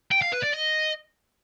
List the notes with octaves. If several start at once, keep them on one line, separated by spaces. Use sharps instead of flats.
G5
F5
B4
D5
D#5